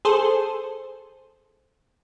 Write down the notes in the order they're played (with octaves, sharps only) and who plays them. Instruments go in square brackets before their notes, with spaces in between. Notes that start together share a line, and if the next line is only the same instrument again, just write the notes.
[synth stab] G#4 A4 C5